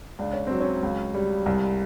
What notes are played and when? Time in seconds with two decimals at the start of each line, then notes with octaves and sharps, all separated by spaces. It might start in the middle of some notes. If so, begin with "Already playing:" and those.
0.19 C#2 D4
0.33 C#4
0.47 F#3 C4
0.60 C#4
0.83 C#2
1.14 G3
1.46 C2